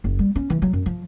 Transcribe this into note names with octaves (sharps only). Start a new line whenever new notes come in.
F#1
G3
C#4
E3
F#3
F#2
F3